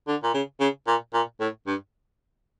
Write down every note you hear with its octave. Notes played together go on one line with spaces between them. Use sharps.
D3
A#2
C#3
C#3
A#2
A#2
A2
G2